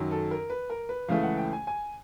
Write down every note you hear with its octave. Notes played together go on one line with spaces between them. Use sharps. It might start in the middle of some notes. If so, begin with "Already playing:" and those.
Already playing: F#2 D#3 F#3
A4
A#4
B4
A#4
B4
C#2 C#3 E3 A3 F5
F#5
G5
G#5
G#5